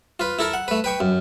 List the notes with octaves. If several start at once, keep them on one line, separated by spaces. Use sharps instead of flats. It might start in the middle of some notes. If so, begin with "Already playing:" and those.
F4 B4
E4 A4 A#4
F#5
A3 B4
B4 G5 C#6
F#2